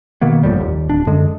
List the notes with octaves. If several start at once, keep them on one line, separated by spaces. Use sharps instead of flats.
B2 D#3 A#3 B3
G1 F2 A2 G3
D#2
D1 D4
F#2 D3 G#3